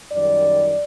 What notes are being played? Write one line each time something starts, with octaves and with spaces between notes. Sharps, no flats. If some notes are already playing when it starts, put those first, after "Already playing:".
F#2 D#3 G3 D5